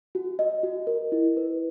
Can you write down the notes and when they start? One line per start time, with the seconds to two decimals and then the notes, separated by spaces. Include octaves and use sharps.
0.15 F#4
0.39 D#5
0.63 F#4
0.87 A#4
1.12 E4
1.37 B4